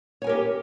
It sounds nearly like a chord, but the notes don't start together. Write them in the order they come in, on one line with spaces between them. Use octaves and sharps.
C#5 G#5 A#4 G4